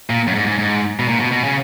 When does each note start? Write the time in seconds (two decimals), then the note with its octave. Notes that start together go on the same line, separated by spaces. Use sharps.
0.10 A#2
0.27 F#2
0.35 G#2
0.46 G#2
0.59 G#2
0.99 B2
1.08 A#2
1.20 B2
1.32 B2
1.44 C#3